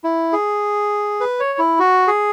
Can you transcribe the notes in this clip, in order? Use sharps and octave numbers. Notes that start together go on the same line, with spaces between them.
E4
G#4
B4
C#5
E4
F#4
G#4